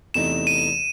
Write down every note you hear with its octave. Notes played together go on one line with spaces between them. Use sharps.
E2 C3 E3 A3 D#4 E7
D#7